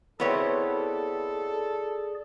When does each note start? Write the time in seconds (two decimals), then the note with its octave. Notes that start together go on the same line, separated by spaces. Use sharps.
0.20 B2 B3 C4 E4 G#4 A4 C#5 D5